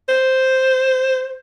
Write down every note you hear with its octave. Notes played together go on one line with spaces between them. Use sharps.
C5